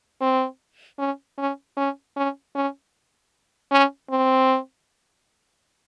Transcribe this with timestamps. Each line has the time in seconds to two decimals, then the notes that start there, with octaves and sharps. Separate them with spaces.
0.21 C4
0.99 C#4
1.38 C#4
1.77 C#4
2.17 C#4
2.55 C#4
3.72 C#4
4.10 C4